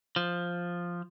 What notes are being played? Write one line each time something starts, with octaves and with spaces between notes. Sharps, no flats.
F3